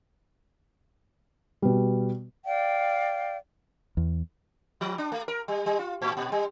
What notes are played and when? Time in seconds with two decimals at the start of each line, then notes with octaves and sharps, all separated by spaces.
1.62 B2 G3
2.45 D5 F5 G5
3.97 E2
4.81 F3
4.98 D4
5.12 A3
5.28 A#4
5.48 G3
5.66 G3
5.79 F4
6.02 A2
6.17 A#2
6.32 G3